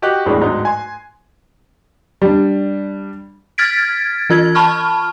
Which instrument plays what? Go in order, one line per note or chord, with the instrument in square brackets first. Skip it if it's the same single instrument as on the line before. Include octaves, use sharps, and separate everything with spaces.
[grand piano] F#4 G4 D#5 G5 F#6
E2 A2 E3 G3 G#3 D4
D1 G#2 D#4
G#5 C6
G3 D4
[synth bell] F6 G#6 A6 B6 D7
E3 F4 G#6
A5 B5 C#6 F6